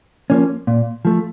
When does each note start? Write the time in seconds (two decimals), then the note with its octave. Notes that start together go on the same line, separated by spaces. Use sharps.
0.30 F3 A#3 C#4
0.67 A#2
1.05 F3 A3